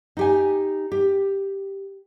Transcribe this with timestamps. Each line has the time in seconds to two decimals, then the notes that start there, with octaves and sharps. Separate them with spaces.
0.17 D#4 G4 G#5
0.92 G4